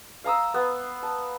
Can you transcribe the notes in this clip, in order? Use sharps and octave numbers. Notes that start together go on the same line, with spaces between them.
F5 A#5 D#6 E6
B3
A5